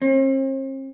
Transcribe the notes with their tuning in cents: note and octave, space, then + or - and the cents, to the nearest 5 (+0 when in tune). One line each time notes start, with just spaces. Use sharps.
C4 +45